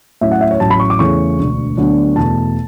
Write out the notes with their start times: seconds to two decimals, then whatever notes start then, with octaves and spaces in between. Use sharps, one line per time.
0.21 A2 F#3 C#4 E4 E5
0.31 F#5
0.41 E5
0.51 C#5
0.60 A1 A2 F#3 C#4 E4 A5
0.70 B5
0.80 C#6
0.90 D6
0.99 E2 C#3 E3 A3 C#4 C#6
1.39 E1 D2 D3
1.77 D2 D3 F#3 B3 D4
2.16 E2 B2 A3 A5